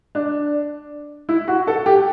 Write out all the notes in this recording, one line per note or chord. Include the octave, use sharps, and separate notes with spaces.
D4
E4
F#4
A4
G4